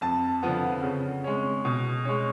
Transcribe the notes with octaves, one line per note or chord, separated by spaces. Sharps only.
F2 A5
D3 F3 B3
C#3
G#3 C#4
B2
G#3 C#4